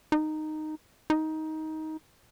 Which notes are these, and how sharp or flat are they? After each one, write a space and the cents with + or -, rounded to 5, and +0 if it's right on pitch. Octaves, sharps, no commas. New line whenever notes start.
D#4 -10
D#4 +15